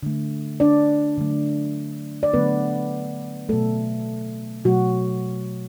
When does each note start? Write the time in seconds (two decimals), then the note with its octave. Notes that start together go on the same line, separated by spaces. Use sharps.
0.03 D3 A3
0.60 D4 D5
1.17 D3 F#3 A3
2.23 D5
2.34 D3 F#3 A3 B3 B4
3.49 B2 F#3 A3 A4
4.65 B2 F#3 A3 F#4